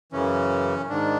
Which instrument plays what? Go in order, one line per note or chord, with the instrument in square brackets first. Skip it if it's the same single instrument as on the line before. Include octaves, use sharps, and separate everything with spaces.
[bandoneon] F#2 C#3 E3 C#4
G#2 D#3 D4